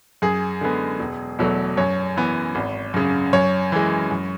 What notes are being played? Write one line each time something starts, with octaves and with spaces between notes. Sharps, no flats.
F#2 G#4
D3 G#3 B3
E1
E2 B2 F#3 A3
F#2 C#5
E3 B3
G#1
F#2 C#3
F#2 C#5
E3 G#3
F#2